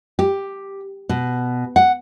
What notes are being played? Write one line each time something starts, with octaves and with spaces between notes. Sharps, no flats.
G4
B2
F#5